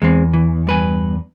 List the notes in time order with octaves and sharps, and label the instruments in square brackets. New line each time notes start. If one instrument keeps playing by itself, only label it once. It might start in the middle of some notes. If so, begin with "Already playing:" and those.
[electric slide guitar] E2 [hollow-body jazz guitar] G#3 C4
[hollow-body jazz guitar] E3
G2 B4 G#5